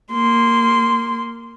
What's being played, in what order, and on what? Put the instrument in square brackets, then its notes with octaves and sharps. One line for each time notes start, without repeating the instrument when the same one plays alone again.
[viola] A#3 C6